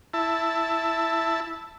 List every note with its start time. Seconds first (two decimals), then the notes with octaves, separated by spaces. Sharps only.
0.14 E4 A5